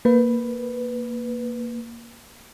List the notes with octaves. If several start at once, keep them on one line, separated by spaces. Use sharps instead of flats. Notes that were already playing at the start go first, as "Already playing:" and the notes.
A#3 B4